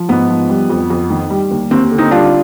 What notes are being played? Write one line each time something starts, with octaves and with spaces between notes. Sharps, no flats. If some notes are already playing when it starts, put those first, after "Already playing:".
Already playing: F3
G#2 B3
F3
G3
F2
F2
D#3
G3
D#2
D#2 C4
D3
C4 D#4
G3 D4 F4